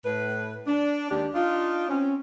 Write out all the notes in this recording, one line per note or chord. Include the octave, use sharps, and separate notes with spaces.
A2 B4
D4
D#2 G#3 D4 G4 D5
D4 D#4 F4
C4 C#4